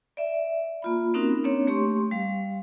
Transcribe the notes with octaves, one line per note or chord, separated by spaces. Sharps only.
D5 E5
A#3 F4 B5
A#3 C4 C#4 D#4 F#4 A#4
A#3 C4 D4 C#5
A3 G4 C6 C#6
G3 F5